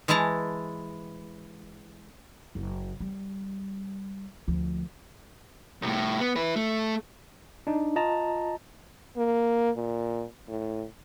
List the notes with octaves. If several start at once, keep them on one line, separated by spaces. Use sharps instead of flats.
E3 G#3 E4 A5 A#5
F#1
G3
D2 F3
C2 A2
B3
E4 B4
A3
D4 D#4
F4 D#5 A5 A#5
A#3
A#2
A2